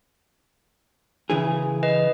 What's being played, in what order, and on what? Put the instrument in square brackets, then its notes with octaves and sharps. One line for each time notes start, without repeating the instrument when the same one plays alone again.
[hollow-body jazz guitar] C#3 E3 G#4
[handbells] B4 D#5